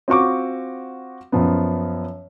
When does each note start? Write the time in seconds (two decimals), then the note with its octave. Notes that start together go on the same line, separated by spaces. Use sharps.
0.08 C4 F4 F#4 C#6 D6
1.32 F#2 F3 B3